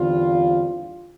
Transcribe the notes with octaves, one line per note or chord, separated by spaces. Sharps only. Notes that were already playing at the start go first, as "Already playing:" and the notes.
Already playing: E2 D3 G3 C4 F4